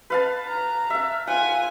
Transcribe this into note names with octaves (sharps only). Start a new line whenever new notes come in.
B4 F5 A5
A#5
E5 F5
F4 F#5 G#5